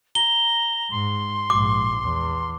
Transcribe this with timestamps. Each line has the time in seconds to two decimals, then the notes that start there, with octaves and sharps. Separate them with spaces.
0.15 A#5 G7
0.91 G#2 C6
1.50 A#1 G#2 D6
2.03 E2